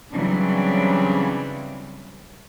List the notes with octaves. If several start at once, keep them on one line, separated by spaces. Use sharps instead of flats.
C#3 E3 F#3 G3 C4 D4